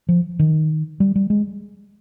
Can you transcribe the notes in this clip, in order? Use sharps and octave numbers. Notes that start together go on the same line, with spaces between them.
F3
D#3
G3
G3
G#3